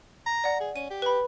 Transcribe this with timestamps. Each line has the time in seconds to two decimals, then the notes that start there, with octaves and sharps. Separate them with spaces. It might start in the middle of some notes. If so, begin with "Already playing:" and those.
0.26 A#5
0.44 D5 F#5
0.61 G#4
0.76 C#4 D#7
0.91 G4
1.02 B4 B5